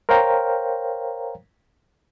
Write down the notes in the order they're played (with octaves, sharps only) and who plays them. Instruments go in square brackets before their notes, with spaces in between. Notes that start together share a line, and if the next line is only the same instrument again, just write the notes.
[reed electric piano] A#4 C5 C#5 F5 G5 A#5